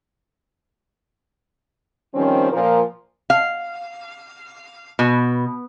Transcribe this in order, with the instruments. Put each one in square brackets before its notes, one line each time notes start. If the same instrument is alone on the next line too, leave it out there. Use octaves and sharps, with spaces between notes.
[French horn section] D#3 F3 G3 C4 C#4
A#2 F3 A#4
[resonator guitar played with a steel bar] F5
B2